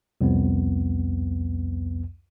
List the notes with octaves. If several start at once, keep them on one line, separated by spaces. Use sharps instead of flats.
C2 F2 B3